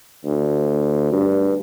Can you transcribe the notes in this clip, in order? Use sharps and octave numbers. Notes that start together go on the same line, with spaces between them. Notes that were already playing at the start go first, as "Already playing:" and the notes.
D2
G2